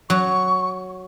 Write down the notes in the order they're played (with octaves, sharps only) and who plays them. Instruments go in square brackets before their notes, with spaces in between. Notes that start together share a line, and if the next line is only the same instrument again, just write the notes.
[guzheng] F#3 [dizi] C#6